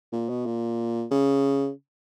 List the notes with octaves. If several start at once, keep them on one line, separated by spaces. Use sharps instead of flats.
A#2
B2
A#2
C#3